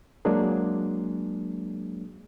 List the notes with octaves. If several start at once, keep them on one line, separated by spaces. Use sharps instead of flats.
F#3 G#3 A#3 D4 G#4